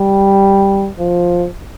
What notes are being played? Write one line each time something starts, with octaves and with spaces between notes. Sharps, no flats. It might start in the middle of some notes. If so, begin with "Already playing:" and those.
Already playing: G3
F3